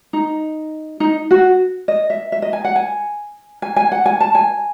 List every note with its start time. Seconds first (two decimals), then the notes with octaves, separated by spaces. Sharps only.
0.13 D#4
1.00 D#4
1.31 F#4
1.88 D#5
2.10 E5
2.32 E5
2.42 D#5
2.53 G#5
2.65 F#5
2.76 G#5
3.62 G#5
3.76 G#5
3.92 F#5
4.06 G#5
4.20 A5
4.35 G#5